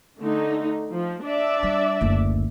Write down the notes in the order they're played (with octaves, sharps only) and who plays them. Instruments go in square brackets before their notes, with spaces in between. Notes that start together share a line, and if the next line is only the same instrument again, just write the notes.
[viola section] D3 A3 D#4
F3
D4 D5 E5
[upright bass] G3
F#1 D2